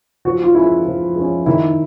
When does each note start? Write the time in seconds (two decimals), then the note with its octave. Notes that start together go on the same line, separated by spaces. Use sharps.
0.25 F3 F#4
0.44 F4
0.55 G#3 C#4 E4
0.86 F3
1.16 G#3 C#4
1.46 D#3 E4